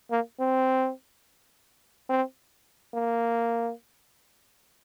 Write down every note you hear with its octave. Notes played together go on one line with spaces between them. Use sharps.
A#3
C4
C4
A#3